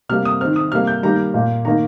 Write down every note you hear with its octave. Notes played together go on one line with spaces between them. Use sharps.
C3 G3 A#3 F6
D#6
D#3 C4 F6
D#6
C3 G3 A#3 F6
G6
D#3 G3 A#3 A#5
A#2 A#3
D#3 A#3 A#5